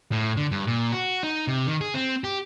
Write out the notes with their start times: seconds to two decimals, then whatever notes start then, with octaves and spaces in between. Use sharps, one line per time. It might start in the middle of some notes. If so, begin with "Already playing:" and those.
0.12 A2
0.37 D3
0.52 G2
0.67 A#2
0.92 F#4
1.23 D#4
1.47 C3
1.67 D#3
1.81 G#4
1.94 C4
2.24 G4